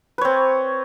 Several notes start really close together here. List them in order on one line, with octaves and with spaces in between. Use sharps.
B4 C#5 C4